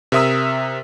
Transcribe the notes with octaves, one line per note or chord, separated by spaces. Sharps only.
C3 A#4 E5 D#6 E6